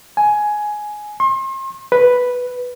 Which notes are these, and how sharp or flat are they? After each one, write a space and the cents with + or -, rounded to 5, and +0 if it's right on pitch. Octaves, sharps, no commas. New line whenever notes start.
G#5 +10
C6 +40
B4 +0